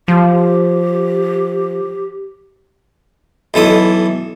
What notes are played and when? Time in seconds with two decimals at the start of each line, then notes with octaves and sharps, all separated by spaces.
0.08 F3 G4
3.54 B1 E3 A4 D#6